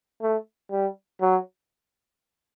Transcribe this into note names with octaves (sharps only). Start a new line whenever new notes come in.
A3
G3
F#3